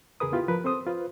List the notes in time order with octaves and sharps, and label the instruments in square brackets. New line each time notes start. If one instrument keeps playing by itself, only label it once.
[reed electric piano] E2 C#3 G#4 A#4 B4 D#6
B3 E4 F4 G4 B4
F3 A#4 B4
C4 A4 C5 D#6
F4 B4 C5